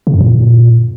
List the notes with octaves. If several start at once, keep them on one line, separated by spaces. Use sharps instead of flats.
C#3
F#2
A#2